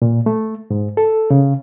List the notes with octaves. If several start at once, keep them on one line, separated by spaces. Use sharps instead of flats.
A#2
A3
G#2
A4
C#3